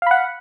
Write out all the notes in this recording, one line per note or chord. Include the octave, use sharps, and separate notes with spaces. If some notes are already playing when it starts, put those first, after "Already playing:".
F5 F#5 B5